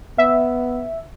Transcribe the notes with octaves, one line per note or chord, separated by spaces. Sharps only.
B3 E5